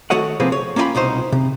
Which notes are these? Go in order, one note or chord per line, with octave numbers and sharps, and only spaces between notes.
D#3 A3 F#4 C#5 D#5 F#5
C3 F3 A#3 C4 G#4 B4
C#5
A#3 C#4 F4 D#5 G5 B5
C2 B2 D#4 C5
C3